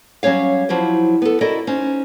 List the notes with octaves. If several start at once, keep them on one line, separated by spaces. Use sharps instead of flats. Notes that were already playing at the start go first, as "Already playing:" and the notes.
F#3 G3 C#4 C#5 F5
F3 F#3 E4 G4 C5
B3 A4
E4 F#4 A4 A#4 D5 D#5
C#4 D#4 C5